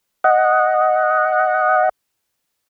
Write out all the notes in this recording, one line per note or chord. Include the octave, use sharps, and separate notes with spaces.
D#5 F#5